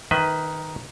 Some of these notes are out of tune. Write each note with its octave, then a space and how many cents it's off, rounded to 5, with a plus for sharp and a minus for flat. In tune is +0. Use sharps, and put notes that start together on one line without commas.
D#3 +0 B4 +10 E5 -45